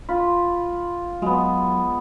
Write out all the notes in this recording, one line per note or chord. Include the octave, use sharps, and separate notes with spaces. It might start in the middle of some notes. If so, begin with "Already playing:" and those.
F4 B5
F#3 G#3 B3